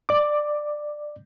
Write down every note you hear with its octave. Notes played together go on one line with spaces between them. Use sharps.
D5 D6